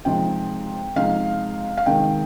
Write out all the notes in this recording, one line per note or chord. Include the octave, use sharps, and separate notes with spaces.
C3 F3 G#3 D#4 G5
C3 F3 G#3 D#4 F5
F5
C3 D#3 G#3 G5